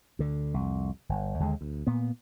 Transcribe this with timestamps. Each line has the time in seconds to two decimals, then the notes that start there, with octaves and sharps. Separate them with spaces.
0.19 D2 D3
0.54 C2 F2
1.09 G1
1.40 D#2 D3 G3 G#3
1.61 D2
1.87 A#2 B3